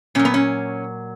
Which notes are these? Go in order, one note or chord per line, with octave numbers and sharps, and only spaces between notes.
A#2 F#3 C#4
B3
C#4